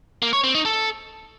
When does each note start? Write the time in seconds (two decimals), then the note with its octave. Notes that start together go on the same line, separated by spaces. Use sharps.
0.22 A#3
0.33 C#5
0.44 C4
0.54 D#4
0.65 A4